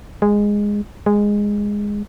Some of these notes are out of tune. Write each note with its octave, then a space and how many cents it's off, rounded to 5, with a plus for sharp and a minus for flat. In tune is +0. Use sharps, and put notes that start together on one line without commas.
G#3 -10
G#3 -10